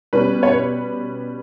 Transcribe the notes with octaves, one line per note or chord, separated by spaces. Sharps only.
B2 G3 C#4 B4
C#5
B4